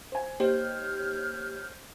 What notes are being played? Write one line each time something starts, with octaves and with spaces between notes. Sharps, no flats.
C5 G#5
A#3 D#4 G4 C5 C#5 F6 G6